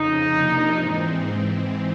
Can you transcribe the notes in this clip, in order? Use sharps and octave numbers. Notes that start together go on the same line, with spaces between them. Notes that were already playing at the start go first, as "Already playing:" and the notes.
Already playing: F2 C#3 F3 D#4
C3 F3 A#3 D4
G#2 E3 G#3 C4